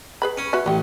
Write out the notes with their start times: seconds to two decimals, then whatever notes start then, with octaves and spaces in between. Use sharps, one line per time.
0.22 G#4 B4 B5
0.37 C#4
0.53 F#4 B4 E5
0.66 A1 G3 G4